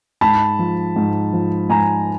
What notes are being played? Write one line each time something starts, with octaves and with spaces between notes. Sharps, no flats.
G#2 A5 B5
F3
G#2
F3
G#2 G#5 A#5